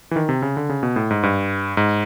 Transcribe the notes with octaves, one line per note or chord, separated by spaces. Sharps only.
E3
D#3
C3
C#3
D3
C#3
B2
A2
G#2
G2
G#2